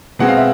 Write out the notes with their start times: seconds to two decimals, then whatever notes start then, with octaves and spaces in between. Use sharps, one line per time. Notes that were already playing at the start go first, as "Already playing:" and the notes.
0.19 B2 G#3 C4 F#5
0.29 F5
0.37 E5